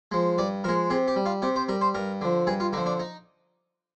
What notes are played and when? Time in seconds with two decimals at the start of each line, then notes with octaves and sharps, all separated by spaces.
0.11 F3 G#3
0.38 G2 D5
0.64 F3 A#4
0.69 G#3
0.90 C3 G#4
1.08 G4
1.16 G3
1.26 F4
1.42 C3 G4
1.56 C5
1.68 G3 A#4
1.81 C5
1.94 G2 A#4
2.21 D3 F3
2.47 G2 G#4
2.60 F4
2.73 D3 D#4
2.77 F3
2.86 D4
2.99 D#4